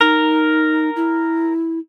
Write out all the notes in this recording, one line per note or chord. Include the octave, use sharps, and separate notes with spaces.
D#4 A#4
E4